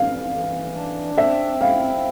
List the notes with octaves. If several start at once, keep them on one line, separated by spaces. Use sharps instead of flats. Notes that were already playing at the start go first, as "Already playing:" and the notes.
Already playing: E3 F5
E3
D4
C4 E5
E4 F5